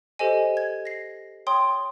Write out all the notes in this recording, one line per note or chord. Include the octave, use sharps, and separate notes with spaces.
G4 A4 C5 D#5 G#5
G#6
A#6 C7
C#5 G5 C6 D#6